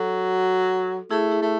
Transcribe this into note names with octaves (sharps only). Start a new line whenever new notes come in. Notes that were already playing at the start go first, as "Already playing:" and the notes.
Already playing: F#3 F#4 A4
A3 E4 G#4
E4 G#4
A3